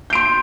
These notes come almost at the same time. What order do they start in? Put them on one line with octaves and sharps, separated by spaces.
G6 D7 C6